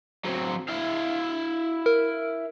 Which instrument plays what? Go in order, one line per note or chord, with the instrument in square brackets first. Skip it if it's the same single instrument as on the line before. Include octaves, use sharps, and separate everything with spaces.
[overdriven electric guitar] F#3 C4
E4 F5
[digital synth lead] A#4